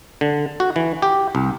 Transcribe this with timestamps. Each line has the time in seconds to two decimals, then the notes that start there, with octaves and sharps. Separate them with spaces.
0.21 D3
0.60 F#4
0.76 E3
1.02 G4
1.35 C2